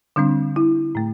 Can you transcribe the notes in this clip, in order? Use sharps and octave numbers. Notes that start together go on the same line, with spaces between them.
D3 G3 C4 D4
E4
A2 A3